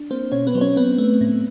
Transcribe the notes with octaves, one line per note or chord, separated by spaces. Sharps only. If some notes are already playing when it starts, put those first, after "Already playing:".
Already playing: D4
A#3 C4 C5
B2 C#4 C#5
B3 B4
F#3 C5
C#4 C#5
B3 C4 B4
A3
A2